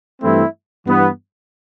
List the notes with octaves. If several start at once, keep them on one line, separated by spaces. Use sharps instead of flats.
G2 E3 A3 C4 E4
G2 E3 B3